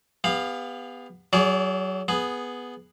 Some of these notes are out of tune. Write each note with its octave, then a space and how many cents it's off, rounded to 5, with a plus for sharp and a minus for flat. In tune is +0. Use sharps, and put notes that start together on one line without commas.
B3 +10 G4 +45 F5 +0
F#3 +25 G#4 +0 D5 -30
B3 +0 G#4 +0